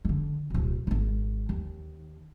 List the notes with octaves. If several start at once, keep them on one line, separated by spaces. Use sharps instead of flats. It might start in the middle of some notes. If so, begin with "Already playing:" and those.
D3 E3
D1 B1
G#1 C3
D#2